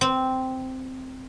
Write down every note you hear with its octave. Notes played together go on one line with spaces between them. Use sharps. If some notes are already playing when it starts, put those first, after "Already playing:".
C4